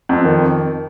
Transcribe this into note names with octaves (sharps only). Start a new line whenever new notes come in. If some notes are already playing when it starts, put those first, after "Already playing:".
F2
D#3